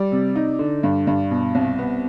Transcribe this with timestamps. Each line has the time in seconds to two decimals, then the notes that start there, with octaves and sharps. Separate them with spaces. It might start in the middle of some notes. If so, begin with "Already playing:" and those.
Already playing: G3 D5
0.12 C3
0.35 D#4
0.59 D3
0.83 G2
1.07 G2
1.31 B2
1.55 C2
1.78 B3